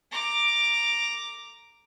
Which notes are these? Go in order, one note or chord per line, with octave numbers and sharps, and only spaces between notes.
A#5 D6